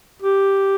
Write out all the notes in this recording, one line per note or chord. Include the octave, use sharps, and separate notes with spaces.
G4